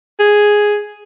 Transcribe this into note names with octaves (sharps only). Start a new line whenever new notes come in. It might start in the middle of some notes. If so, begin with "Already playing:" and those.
G#4